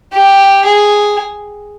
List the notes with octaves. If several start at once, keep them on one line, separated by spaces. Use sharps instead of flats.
G4
G#4